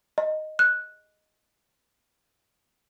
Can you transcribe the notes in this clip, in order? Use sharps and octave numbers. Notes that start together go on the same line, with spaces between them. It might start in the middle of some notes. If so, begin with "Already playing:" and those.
D#5
F#6